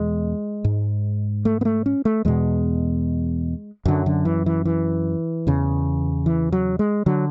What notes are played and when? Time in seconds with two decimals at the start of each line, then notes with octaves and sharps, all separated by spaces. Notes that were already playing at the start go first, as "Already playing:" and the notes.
Already playing: E2 B2 G#3
0.64 G#2
1.45 A3
1.61 B3
1.65 A3
1.86 C#4
2.05 A3
2.25 E2 B2 G#3
3.85 F#2 D3 F#3
4.06 D3
4.25 E3
4.46 E3
4.65 E3
5.47 E2 C#3
6.26 E3
6.52 F#3
6.79 G#3
7.06 D3 F#3